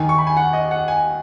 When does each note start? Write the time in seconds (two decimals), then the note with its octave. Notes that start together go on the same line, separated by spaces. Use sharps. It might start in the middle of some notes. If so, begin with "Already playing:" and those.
Already playing: D#2 D#3 G#5
0.09 C#6
0.18 B5
0.27 G#5
0.37 F#5
0.53 D#5
0.71 F#5
0.88 G#5